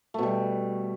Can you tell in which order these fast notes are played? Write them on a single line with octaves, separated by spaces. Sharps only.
A3 B2 G3